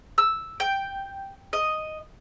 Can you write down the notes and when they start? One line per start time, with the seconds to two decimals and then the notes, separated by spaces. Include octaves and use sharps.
0.18 E6
0.60 G5
1.53 D#5